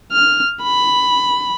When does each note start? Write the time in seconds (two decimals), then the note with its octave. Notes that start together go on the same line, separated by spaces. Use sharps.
0.12 F6
0.63 B5